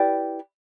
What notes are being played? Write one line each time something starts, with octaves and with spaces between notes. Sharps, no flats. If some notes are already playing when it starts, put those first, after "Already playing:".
Already playing: E4 G4 B4 D5